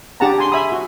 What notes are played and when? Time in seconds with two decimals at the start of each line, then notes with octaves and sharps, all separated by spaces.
0.20 D4 G4 G#4 F#5 A5 A#5
0.38 G#5 C6
0.52 E5 G#5 B5 D#6
0.72 F#4